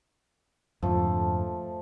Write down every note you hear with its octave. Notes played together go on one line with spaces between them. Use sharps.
F2 G#2 D3 F3 A3